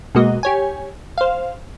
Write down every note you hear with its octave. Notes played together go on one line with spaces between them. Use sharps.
B2 G#3 A#3 F#4 D#5
G4 C#5 G#5
C5 F5